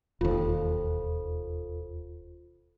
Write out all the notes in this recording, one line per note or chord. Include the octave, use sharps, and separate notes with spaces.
E1 D#2 F4 A4 C5